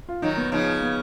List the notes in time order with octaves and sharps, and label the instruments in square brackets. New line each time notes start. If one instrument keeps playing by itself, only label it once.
[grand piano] F4
[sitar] D#3 F#3 [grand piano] D#4
[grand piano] B3
[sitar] C#3 F3 [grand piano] D#4
[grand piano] B3